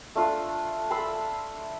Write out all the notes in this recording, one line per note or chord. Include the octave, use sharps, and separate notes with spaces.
A3 D4 F4
A5 B5 C6 E6